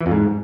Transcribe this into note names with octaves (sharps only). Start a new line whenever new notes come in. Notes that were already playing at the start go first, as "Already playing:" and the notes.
E3
F2
G#2